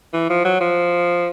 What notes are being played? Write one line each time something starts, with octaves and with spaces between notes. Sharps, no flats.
E3
F3
F#3
F3